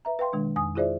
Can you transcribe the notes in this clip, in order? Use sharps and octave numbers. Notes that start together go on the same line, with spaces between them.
B4 E5 A#5
B4 F5 G5 C6
B2 D#3 G#3 D4
F2 G#5 D#6
E4 F4 G#4 C5 D5 E5